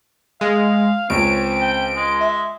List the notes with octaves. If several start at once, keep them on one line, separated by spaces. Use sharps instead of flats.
G#3 F5
C#2 C4 C#5 D7
G5
G#3
E5